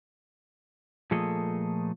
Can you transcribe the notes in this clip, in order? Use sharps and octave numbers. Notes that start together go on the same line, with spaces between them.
A#2 F3 A3 G#4 A4 D#5